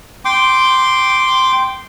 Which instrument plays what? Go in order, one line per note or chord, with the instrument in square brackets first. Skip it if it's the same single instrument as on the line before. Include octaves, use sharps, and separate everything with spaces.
[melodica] G5 C6 D6